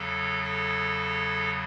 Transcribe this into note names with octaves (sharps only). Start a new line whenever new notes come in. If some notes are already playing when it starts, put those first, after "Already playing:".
Already playing: E2 C#3 F#3 A4
A4